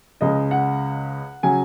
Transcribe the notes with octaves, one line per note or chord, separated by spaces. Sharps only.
C#2 C#3 G#3 D#5
F#5
C#3 F#3 G#5